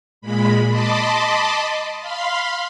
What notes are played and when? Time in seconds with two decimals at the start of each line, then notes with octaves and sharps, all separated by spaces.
0.21 A#2 G#3 B5
0.67 D#5 A5 B5 C6 D6
2.01 F5 B5 C6